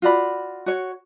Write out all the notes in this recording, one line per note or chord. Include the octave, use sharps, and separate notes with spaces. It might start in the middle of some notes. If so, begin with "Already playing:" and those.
F4 F#4 D5 B5
F#4 C#5